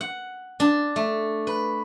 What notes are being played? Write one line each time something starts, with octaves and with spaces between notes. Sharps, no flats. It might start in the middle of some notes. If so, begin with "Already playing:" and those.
F#5
D4
A3
B4